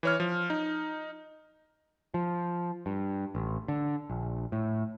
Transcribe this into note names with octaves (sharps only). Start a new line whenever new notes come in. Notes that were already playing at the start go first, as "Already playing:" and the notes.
E3 C#5 F6
F3
D#4
F3
G2
A1
D3
A#1
A2